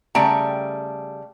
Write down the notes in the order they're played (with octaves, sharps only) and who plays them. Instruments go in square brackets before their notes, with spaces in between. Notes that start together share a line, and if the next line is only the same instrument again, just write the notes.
[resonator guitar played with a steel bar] C#3 G3 A3 G5 A#5